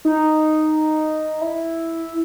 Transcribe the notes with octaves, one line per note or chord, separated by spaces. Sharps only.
D#4
E4